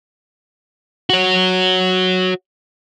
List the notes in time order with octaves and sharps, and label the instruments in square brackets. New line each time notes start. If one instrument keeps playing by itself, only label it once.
[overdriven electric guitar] F#4 C#5